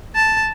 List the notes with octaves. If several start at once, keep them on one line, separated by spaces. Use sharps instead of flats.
A5